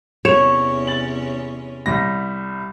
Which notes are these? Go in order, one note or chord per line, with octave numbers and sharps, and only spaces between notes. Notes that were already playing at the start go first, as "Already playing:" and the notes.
E2 C3 C#4 C#5 E7 F7
A6 F#7
C2 G3 A#6